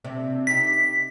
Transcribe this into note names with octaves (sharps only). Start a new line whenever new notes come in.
C3 C4 D4
D#4 G4 B6